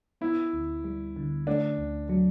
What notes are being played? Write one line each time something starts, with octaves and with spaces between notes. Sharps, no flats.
B3 E4
D2
G3
D3
A3 D4
D2
F#3